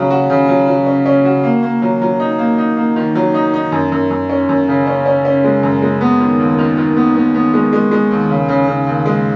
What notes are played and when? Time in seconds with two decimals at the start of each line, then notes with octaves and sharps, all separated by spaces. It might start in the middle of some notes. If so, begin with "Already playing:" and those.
Already playing: C#3 F#3 F#4
0.10 F#4
0.30 C#3
0.49 F#3
0.68 F#3
0.87 C#4
1.06 C#4
1.25 F#4
1.44 A#3
1.63 A#3
1.82 F#3
2.02 F#3
2.20 D#4
2.39 A#3
2.58 D#4
2.77 A#3
2.96 D#3
3.15 F#3
3.34 D#4
3.54 D#4
3.72 F#2
3.92 F#2
4.10 F#2
4.30 C#4
4.49 F#2
4.68 C#3
4.87 C#4
5.06 C#4
5.25 C#4
5.44 G#3
5.63 F#2
5.82 G#3
6.01 B3
6.20 D#3
6.39 D#2
6.58 D#3
6.77 D#3
6.96 B3
7.15 B3
7.35 B3
7.54 G#3
7.73 G#3
7.91 G#3
8.11 D#2
8.29 C#3
8.49 C#3
8.68 C#3
8.87 D#2
9.06 G#3